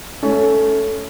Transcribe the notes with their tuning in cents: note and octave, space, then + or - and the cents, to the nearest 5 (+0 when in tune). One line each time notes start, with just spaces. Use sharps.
A3 +0 C#4 +15